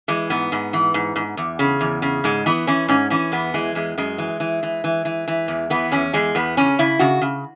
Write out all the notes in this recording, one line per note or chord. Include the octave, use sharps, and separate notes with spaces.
E3 G#3
G#2 B3
G#2
E3
G#2
G#2
E2
C#3
E2
C#3
G#2 G#3
E3 B3
E3 C#4
G#2 C#4
E3 C#4
E2 B3
E3 G#3
E2 G#3
F#2 G#3
E3
E3
E3
E3
E3
E3
E2
E3 B3
E2 C#4
E2 G#3
E2 B3
C#3 C#4
C#3 E4
C#3 F#4
C#3